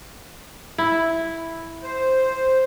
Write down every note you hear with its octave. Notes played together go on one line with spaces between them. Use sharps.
E4
C5